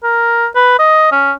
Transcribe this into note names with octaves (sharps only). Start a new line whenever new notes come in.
A#4
B4
D#5
C#4